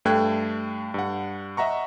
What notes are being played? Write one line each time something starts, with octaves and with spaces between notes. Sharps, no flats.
G2 A3 G5 F#6 G#6
G2 F#5
D#5 E5 F#5 A#5 C#6